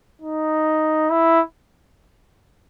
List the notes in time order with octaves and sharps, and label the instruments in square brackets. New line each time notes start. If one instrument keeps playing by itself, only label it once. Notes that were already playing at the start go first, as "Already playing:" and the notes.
[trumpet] D#4
E4